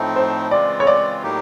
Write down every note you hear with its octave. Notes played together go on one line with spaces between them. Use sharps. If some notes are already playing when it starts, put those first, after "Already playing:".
Already playing: A2 F3 A3 C4 D#4
C5
C#3 E3 G#3 C4 F4 D5
C#5
D5
A2 F#3 A#3 D#4 G4